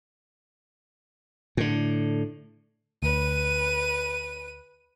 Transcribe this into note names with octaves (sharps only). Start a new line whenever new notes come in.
A2 D3
D2 B4 D#7